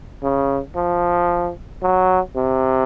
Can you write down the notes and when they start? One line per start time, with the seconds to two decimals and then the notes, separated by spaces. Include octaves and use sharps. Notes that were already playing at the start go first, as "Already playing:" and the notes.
0.23 C#3
0.76 F3
1.83 F#3
2.36 C3